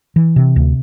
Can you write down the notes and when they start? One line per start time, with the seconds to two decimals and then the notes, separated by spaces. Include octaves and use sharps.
0.16 E3
0.36 C3
0.56 D2